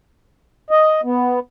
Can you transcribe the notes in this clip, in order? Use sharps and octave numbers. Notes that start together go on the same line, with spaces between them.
D#5
B3